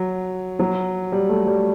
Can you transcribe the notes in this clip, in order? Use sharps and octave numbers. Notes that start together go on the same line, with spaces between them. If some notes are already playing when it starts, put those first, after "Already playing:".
Already playing: F#3
F#3
G3
A3
G3